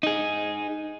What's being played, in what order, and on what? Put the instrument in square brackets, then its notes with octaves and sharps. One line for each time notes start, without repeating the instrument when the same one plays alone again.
[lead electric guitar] D#4 G#4